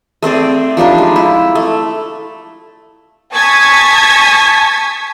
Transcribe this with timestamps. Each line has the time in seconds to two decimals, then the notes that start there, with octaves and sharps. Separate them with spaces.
0.22 A3 C4 G#4 D5
0.77 F3 G3 D4 D#4
0.98 G#3
1.16 E4
1.55 A3
3.33 G#5 A5 C#6 D#6 G#6 B6